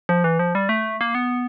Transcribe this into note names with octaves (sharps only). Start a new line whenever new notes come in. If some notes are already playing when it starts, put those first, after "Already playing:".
F3
E3
F3
G3
A3
A#3
B3